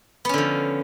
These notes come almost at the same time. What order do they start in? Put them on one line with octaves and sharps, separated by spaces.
B3 C#4 D3 F3